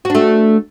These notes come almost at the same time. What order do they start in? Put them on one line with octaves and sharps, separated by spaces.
F#4 D4 A3